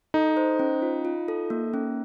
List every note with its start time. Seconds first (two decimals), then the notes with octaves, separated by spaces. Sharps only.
0.14 D#4 A4
0.37 C5
0.59 C#4
0.82 F4
1.05 F4
1.28 A4
1.50 A#3
1.74 C#4